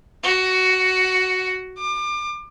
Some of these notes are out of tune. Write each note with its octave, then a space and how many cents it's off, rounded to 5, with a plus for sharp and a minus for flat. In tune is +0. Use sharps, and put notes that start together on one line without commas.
F#4 +10
D6 +30